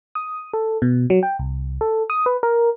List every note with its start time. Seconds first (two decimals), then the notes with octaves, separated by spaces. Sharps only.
0.15 D#6
0.53 A4
0.82 B2
1.10 F#3
1.23 G5
1.39 C2
1.81 A4
2.10 D#6
2.26 B4
2.43 A#4